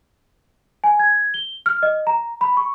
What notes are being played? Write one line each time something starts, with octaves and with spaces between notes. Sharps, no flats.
G#5
G#6
G7
F6
D#5
A#5
B5
C#6